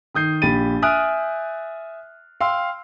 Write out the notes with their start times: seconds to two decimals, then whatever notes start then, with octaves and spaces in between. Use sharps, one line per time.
0.14 D#3 D#6 G6 C7
0.42 A#1 G4 B5 A6 D#7
0.82 E5 G#5 D#6 F6 F#6 D7
2.41 F5 G5 C6 E6